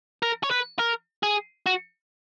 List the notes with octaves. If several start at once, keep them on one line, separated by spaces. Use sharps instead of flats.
A#4
C#5
B4
A#4
G#4
F#4